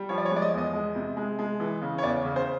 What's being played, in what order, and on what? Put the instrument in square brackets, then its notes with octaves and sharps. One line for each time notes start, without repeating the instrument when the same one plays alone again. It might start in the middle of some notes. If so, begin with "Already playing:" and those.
Already playing: [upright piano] G3
F3 C#5
D5
C#5
G#3
D5
D#5
E2 D#5
G#3
C3
G#3
G#3
E3
C#3
C#5
E2 D5
C#3
C5